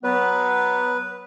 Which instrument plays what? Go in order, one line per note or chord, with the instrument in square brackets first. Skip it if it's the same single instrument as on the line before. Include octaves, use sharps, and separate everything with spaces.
[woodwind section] F#3 B3 [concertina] B4